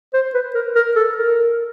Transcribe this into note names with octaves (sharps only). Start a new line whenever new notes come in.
C5
B4
A#4
A#4
A4
A#4